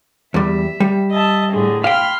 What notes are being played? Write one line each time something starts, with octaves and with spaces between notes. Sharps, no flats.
E2 G3 E5
G3
D#5 E5 A5
A2 D3 G#4
F5 G5 B5 C6 F6